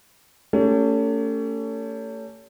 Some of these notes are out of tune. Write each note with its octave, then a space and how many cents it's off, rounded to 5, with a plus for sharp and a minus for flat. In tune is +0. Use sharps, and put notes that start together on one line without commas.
A3 +35 C#4 +30 G4 +15